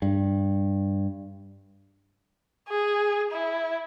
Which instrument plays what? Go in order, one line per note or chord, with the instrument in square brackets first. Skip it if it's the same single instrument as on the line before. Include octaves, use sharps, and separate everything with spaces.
[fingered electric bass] G2
[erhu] G#4
E4